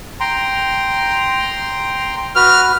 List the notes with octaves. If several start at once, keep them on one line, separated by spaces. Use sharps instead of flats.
G5 A#5 C6
F#4 B4 F6